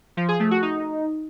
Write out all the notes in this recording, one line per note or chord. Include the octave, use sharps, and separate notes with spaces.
F3
G#4
A3
F#4
D#4